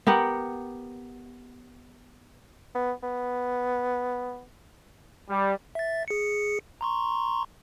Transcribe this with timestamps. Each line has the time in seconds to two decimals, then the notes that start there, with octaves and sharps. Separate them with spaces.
0.07 B3 G4 A#4 F#5
2.75 B3
3.03 B3
5.28 G3
5.75 E5 A6
6.08 G#4 C#7
6.81 A#5 C6 C#6